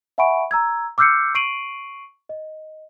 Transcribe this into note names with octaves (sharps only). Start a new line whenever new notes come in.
E5 F#5 G#5 B5 C#6 D7
A#5 E6 G#6
D6 E6 F6 G6 C7 C#7
C#6 C7 D7 D#7 F#7
D#5